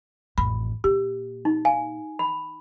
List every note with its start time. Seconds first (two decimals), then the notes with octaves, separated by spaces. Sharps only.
0.38 A1 F2 B5
0.84 A#2 G4
1.45 D#4
1.65 F5 G#5
2.19 B5